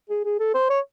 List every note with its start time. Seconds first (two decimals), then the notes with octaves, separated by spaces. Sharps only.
0.10 G#4
0.25 G#4
0.40 A4
0.54 C5
0.70 C#5